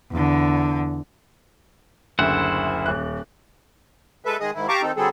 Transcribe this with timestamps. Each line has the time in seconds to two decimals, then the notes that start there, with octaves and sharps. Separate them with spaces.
0.12 E2 D3
2.19 F#1 D2 E4 C5 F#5
2.86 D#1 F#6
4.24 G#3 A4 B4 E5
4.40 D#3 G#3 G#4 D#5 D#6
4.54 G#2 D#3 E4
4.68 G4 F5 A5 A#5 C#6 D6
4.82 D#3 C4 D#4 A4
4.96 D3 F#3 G3 C4 G#4 A4